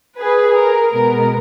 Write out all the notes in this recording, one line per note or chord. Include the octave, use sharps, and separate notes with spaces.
G#4 B4
A#4
B2 G#3 B3 A#4